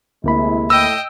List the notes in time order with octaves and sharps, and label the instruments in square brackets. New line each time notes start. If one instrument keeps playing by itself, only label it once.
[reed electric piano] D2 A#3 B5 [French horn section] C3 G#3 E4
[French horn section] A2 [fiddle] D#5 G5 [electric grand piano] E6